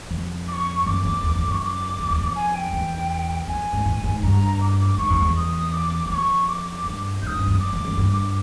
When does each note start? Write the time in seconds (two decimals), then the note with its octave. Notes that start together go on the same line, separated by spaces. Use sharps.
0.11 F2
0.48 D6
0.53 C#6
0.86 F#2 D6
1.05 F2
1.23 E2
1.36 F2
1.48 F#2 C#6
1.61 D6
1.99 F2
2.10 E2
2.21 F2
2.36 G#5
2.55 G5
2.73 E2
3.48 F2 G#5
3.73 G#2
3.86 A2
4.04 G#2
4.23 G2 A#5
4.61 D6
4.79 D6
4.98 G#2 C#6
5.10 F2
5.22 E2
5.36 D#6
5.72 D6
6.06 E2
6.10 F2 D6
6.14 C#6
6.48 D6
6.85 G2
7.22 G#2 D#6 G6
7.35 G2
7.48 F#2
7.60 D6
7.73 F2
7.85 F#2
7.97 G2